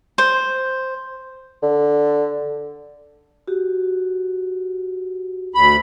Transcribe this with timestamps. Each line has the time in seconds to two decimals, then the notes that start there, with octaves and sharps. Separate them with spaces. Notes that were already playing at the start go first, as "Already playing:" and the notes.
0.18 C5
1.62 D3
3.48 F#4 G4
5.55 D2 B5